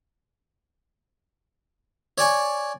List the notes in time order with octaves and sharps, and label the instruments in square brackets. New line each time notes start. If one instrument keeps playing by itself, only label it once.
[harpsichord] C#5 D5 G#5 C#6